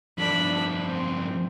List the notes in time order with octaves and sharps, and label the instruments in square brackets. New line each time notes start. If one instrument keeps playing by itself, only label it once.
[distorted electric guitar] G2 F3 [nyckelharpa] D4 B5
[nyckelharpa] C4